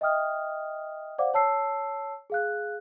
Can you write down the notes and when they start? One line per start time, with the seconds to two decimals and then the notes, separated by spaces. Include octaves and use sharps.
0.01 D#5 E5 G5 D#6 F6
1.18 C5 D5 F5 F#5 D6
1.34 C#5 A5 E6 C7
2.30 G#4 F5 F#6